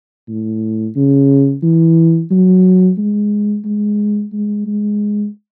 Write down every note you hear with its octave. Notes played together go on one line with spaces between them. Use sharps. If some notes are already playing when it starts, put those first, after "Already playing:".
A2
C#3
E3
F#3
G#3
G#3
G#3
G#3